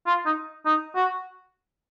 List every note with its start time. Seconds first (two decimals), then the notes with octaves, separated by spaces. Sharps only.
0.06 F4
0.26 D#4
0.66 D#4
0.95 F#4